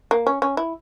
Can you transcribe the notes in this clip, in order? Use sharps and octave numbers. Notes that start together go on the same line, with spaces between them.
A#3
C#4
C#4
E4